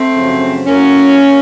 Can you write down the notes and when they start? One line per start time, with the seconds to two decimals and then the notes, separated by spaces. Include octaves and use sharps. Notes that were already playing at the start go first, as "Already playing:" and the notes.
Already playing: A3 C4
0.14 F#2 C#3 F3
0.67 A2 F#3 A#3 C#4